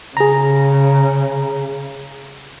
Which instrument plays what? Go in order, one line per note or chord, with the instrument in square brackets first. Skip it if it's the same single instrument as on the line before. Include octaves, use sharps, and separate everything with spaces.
[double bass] C#3 [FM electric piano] G#4 A#5